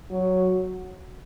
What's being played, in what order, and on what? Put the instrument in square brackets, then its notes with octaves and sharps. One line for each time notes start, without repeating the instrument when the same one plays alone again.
[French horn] F#3